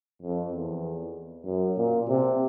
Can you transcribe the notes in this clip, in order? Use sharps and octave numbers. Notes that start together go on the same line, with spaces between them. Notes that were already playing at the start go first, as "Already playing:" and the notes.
F2
E2
F#2
A#2
C3